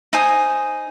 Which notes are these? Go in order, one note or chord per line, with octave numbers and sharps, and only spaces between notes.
D#4 C5 G#5 D#6